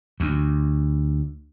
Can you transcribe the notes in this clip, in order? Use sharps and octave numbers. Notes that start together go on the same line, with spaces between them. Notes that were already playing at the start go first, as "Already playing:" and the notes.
D2